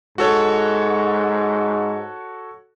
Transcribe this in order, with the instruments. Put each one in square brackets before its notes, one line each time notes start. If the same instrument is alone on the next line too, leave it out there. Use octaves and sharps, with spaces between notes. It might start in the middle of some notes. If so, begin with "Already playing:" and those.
[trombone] G#2 [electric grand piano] F#4 A4 C#5